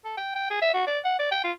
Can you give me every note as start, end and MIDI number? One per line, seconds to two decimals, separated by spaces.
0.05 0.13 69
0.17 0.32 79
0.35 0.46 79
0.50 0.59 68
0.62 0.70 76
0.74 0.85 66
0.87 0.99 74
1.04 1.17 78
1.19 1.29 74
1.31 1.43 79
1.44 1.52 65